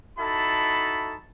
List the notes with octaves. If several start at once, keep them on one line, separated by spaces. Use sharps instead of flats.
D#4 E4 F#4 A4 A5 B5